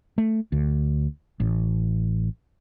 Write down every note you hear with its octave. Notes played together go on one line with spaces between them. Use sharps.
A3
D2
A1